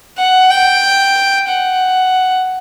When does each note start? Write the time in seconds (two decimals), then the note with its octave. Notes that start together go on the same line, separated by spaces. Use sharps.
0.18 F#5
0.50 G5
1.48 F#5